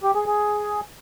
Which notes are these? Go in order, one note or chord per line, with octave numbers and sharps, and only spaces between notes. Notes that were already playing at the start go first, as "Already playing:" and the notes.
G4
G#4
G#4